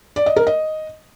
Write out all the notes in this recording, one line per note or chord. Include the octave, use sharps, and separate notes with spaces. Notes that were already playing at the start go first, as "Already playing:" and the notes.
D5
D#5
A#4
D#5